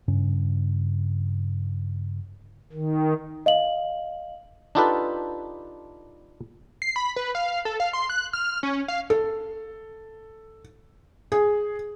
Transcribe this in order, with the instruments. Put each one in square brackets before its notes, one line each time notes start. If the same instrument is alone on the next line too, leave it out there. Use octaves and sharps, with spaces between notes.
[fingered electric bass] G2 C#3 C#4
[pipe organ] D#3
[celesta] D#5 F5 F#7
[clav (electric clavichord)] D4 D#4 F4 G4 A4 B4
[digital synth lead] C7
B5
B4
F5
A4
F5
C6
F#6
F6
C#4
F5
[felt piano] A4
G#4